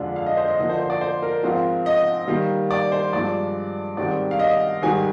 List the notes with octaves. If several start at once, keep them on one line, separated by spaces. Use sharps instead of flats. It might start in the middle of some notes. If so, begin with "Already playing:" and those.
Already playing: F2 D3 G#3 D4 F4
F5
D#5
C5
D#5
D3 F3 A#3 D4 D#5
C5
C5
D5
C5
A#4
G#2 F3 C4 F4
D#5
D#3 G3 A#3
D5
C5
G2 F3 G#3 D4 D5
G#2 D#3 G3 C4 D5
F5
D#5
G#2 D#3 G3 G#5